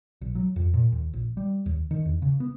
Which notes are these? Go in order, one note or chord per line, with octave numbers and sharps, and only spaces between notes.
B1
F#3
F2
A#2
D#2
A#1
G3
D#2
D#3
E2
C#3
B3